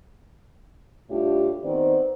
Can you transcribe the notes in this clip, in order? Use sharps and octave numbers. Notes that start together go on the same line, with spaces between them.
A2 G3 D4 E4 F4 G4
D#3 B3 C4 B4 C5 D5